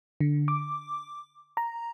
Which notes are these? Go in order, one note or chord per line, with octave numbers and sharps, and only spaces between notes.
D3
D6
A#5